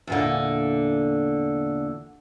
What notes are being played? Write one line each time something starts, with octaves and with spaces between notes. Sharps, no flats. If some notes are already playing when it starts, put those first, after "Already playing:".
E2 A#2 D3